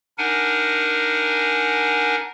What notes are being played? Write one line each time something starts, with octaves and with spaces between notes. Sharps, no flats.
D4 D#4 A#4 F#5 G#5